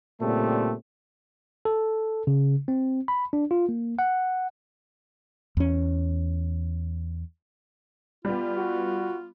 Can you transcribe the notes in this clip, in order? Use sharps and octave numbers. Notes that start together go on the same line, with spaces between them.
A#2 C#3 G3 A3 C4
A4
C#3
C4
B5
D4
F4
A#3
F#5
E2 C#4
G3 B3 F4
F#4